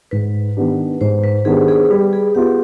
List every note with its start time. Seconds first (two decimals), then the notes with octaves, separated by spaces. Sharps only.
0.11 G#2 B4
0.57 D#3 B3 D4 G4
1.01 G#2 C5
1.24 B4
1.45 D#3 B3 D4 G4 G#4
1.68 G#4
1.90 G3 B4
2.13 G#4
2.35 B3 F4 G4